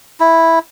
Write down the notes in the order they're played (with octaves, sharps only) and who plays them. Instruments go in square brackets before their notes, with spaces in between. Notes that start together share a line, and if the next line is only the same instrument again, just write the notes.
[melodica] E4